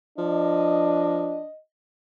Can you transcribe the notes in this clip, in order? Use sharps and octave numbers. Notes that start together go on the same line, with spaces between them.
F3 D4 D#5